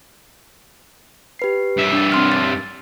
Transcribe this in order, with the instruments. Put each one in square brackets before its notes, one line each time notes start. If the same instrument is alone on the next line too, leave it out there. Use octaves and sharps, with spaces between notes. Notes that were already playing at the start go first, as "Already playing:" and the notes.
[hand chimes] G4 B4 C7
[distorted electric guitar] G2 E5
[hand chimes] D4 A6
C4 C6 F6
A6